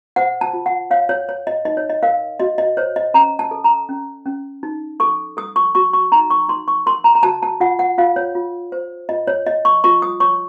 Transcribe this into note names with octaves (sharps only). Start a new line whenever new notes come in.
C5 F#5
A5
F4
F#5
C#5 F5
C#5
C#5
D#5
D#4 D#5
C#5
D#5
A#4 F5
F#4 D#5
D#5
C5 C#5
D#5
C#4 A#5
A5
A4
A#5
C#4
C#4
D#4
A4 C#6
A4 D#6
C#6
F#4 C#6
C#6
D#4 A#5
C#6
D#4 C6
C#6
A#4 C6
A#5
A#5
F#4 A5
A5
F4 F#5
F#5
F4 F5
C#5
F4
C5
F4 D#5
C#5
C#5 D#5
C#6
F4 C#6
D#6
C#5 C#6